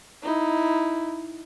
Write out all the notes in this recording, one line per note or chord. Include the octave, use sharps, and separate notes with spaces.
D#4 E4